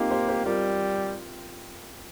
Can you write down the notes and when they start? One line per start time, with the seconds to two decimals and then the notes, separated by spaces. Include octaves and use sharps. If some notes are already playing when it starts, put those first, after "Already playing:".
Already playing: A#3 C4 D#4 F4 G4
0.11 G4 C5
0.28 G4 C5
0.45 G3 F4 A#4